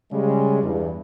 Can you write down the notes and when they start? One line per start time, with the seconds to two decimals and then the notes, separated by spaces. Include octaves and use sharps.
0.11 C#3 G3 G#3
0.62 E2 G2